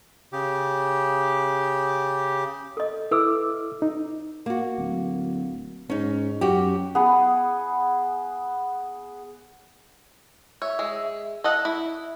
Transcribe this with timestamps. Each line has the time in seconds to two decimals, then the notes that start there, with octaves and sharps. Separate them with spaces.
0.33 C#3 G4
2.77 A4 D#5
3.11 E4 A4 B4 D6 E6
3.82 D#4
4.46 A#3 F#4
4.78 D1
5.90 G#2 C#4 D#4
6.41 F#2 C#4 F#4 G4
6.95 B3 G#4
10.62 C#5 E5
10.79 G#3
11.44 A4 D#5 F#5
11.65 E4